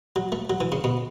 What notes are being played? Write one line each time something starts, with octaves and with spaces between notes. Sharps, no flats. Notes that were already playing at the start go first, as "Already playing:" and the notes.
F#3
A3
F#3
E3
C#3
B2